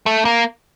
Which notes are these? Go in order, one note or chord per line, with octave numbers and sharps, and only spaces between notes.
A3
A#3